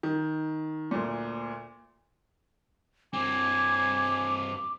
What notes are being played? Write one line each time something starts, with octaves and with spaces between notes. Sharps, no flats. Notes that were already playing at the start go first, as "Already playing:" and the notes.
D#3
D2 A#2
G2 C4 G#5 D6